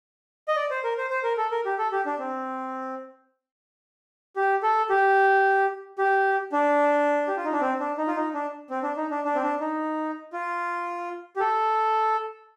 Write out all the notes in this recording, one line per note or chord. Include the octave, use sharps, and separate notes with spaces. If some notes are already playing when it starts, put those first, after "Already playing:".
D#5
D5
C5
A#4
C5
C5
A#4
A4
A#4
G4
A4
G4
D4
C4
G4
A4
G4
G4
D4
G4
F4
D#4
D4
C4
D4
D#4
F4
D#4
D4
C4
D4
D#4
D4
D4
C4
D4
D#4
F4
G4
A4